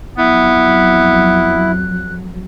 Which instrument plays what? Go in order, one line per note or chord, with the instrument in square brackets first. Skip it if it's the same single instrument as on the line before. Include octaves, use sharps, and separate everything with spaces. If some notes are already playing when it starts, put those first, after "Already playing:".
[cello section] F2 F#3 [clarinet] B3 [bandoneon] E4 [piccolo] F#6